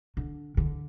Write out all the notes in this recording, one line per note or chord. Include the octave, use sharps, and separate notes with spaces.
D3
D3